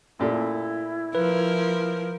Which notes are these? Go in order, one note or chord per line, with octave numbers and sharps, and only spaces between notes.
F#2 A#2 A3 E4
F3 A#4 B4